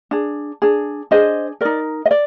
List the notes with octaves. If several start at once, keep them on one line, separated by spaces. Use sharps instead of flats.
D4 G#4
D4 G#4
D4 G#4 C5 D#5
D#4 A#4 D5
D#5
D5